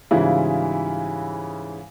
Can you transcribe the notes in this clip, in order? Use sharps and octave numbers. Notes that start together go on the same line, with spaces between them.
G#2 C#3 E3 G3 E4 F4